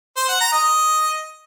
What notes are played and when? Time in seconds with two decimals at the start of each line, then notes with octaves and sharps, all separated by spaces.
0.17 C5
0.28 F#5
0.40 A#5
0.52 D#5